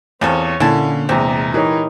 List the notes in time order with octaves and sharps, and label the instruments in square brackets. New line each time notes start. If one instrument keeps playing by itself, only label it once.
[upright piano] E2 [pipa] F3 G3 A4 [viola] C4 C#5
[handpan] A#2 A#3 D4 [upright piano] D3 [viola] C#4 [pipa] E4 G#5 A5
[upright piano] E2 C3 [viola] G#3 A#5 [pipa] C4
[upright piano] E3 [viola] D#4 A#4 [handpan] E4 G4 C#5